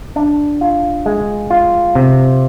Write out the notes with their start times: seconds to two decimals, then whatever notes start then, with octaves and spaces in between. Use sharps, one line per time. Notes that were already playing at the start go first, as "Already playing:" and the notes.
0.16 D4
0.61 F4
1.06 G#3
1.50 F4
1.95 C3